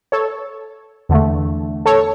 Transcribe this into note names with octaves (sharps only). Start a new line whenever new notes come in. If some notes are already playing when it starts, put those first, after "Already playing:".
A4 C#5
E2 D3 A3
A4 C#5